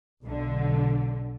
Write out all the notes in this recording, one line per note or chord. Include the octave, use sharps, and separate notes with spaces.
B1 D3